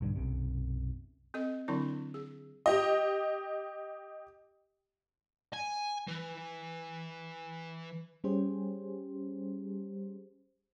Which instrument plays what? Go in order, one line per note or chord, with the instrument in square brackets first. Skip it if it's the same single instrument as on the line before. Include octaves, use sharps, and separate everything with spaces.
[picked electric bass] B1 G2 D3
B1 F#2 C3
[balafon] C4 A4 D#5
D3 F#3 C4 D4 E4
G#4
[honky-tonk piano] G4 D#5
[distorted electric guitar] G#5
E3
[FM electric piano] G3 C#4 G4 G#4 C5